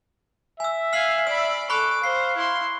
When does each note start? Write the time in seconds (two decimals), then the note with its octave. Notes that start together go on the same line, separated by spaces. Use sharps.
0.60 E5 G#5 E6
0.93 F5 G#5 F6 C7 F#7
1.27 D5 B5 E6
1.70 A4 B5 C#6 D6 F#6
2.03 C5 F5 C7
2.37 E4 C6